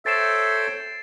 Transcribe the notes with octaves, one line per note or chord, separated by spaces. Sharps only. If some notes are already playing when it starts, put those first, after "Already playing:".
A4 C5 C#5 E5 G5 A6 C7 E7